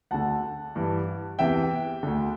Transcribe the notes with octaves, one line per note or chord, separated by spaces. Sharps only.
D2 D3 F#5 A5
G2 E3
E2 C3 E3 E5 G5
D2 D3